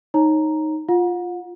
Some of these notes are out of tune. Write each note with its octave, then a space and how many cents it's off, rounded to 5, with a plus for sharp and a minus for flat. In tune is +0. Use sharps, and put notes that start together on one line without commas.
D#4 +0 C#5 -15 A#5 +0
F4 +0 F#5 -40